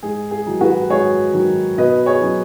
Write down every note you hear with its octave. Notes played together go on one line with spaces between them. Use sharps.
G#2 G#4
G#4
D#3 F#3 D#4
F#4 B4
G#2 G#4 C#5
D#3 F#3 D#4
B2 B4 D#5
G#4 C#5
F#3 C#4